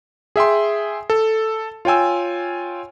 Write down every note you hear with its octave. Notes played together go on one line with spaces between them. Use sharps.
G#4 E5 G5 C6
A4
F4 C#5 G5 G#5 E6